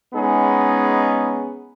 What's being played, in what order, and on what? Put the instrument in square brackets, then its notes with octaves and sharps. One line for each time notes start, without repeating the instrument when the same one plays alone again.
[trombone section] G#3 B3 C#4 D#4 G#4